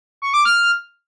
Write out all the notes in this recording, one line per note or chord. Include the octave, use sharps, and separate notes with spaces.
C#6
D6
F6